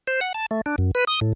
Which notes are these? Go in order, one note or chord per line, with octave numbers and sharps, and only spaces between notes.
C5
F#5
A5
A3
D4
F#2
B4
D#6
A2